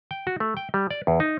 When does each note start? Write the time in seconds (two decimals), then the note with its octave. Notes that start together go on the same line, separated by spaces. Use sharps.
0.11 G5
0.27 F#4
0.40 A3
0.57 G5
0.74 G3
0.91 D5
1.07 E2
1.20 D#4